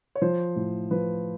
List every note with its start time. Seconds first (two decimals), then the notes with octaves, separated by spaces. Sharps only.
0.15 C#5
0.22 F3 C5
0.56 A2
0.91 F3 B4